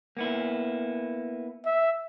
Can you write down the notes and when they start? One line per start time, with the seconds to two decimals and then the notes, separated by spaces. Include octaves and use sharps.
0.17 A#3 B3 E4
1.66 E5